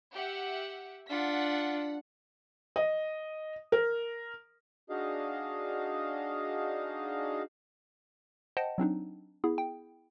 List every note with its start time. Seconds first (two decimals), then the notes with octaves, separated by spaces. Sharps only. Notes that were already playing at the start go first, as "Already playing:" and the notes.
0.12 G4 E5 F#5
1.09 D4 F4 F#5 B6
2.76 D#5
3.72 A#4
4.90 D4 D#4 F#4 G#4 D#5 F5
8.57 C5 D#5 F#5 G5 A5
8.78 F#3 C4 D4 D#4
9.44 B3 E4 G#4
9.58 G5